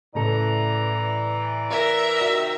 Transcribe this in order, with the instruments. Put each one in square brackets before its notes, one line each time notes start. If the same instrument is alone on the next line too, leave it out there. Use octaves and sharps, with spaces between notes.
[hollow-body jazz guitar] A2 C#3 A4 [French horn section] E3 D5 [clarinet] A#5
[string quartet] A#4 E5
[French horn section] C3 D#3 [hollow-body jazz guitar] F#4